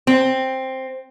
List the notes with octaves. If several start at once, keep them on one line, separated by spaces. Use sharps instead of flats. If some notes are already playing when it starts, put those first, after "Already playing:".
C4